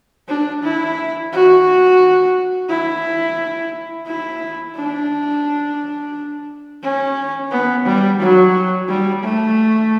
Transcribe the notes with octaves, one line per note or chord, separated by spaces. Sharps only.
D4
E4
F#4
E4
E4
D4
C#4
B3
G3
F#3
G3
A3